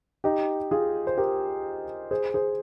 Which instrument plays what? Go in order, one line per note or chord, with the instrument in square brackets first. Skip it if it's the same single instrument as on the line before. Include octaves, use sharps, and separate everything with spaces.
[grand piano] D#4 G4
F4 G#4
C5
G4 A#4
G#4 C5
G#4 C5